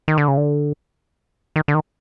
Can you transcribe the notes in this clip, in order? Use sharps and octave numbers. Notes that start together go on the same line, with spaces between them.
D#3
D3
C#3
D3
D#3
D3
D#3